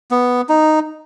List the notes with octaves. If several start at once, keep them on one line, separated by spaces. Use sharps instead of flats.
B3
D#4